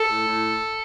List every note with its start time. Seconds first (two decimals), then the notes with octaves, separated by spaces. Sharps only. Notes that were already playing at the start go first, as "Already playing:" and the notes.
Already playing: A4
0.10 A2
0.27 A2